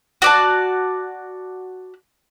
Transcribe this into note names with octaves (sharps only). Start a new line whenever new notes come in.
F#4 D5 A5